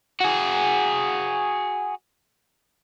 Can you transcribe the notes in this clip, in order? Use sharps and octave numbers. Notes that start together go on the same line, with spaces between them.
F#4 G#4